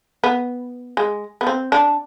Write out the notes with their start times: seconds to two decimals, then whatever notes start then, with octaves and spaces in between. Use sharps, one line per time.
0.24 B3
0.97 G#3
1.41 B3
1.47 C4
1.72 D4